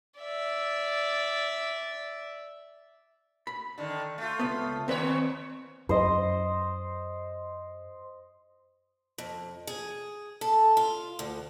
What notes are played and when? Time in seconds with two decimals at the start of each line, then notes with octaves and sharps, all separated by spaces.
0.20 D5 E5
3.47 B5
3.78 D3 D#3
4.18 A3 F4
4.39 C#2 B3
4.88 D#2 C4 B4 C#5
5.89 F#2 C5 D#5
9.18 F2
9.67 G#4
10.41 A4
10.77 F4
11.19 D2